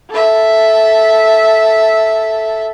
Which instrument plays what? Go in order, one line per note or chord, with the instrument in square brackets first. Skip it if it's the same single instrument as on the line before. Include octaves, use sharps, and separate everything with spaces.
[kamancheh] A4 E5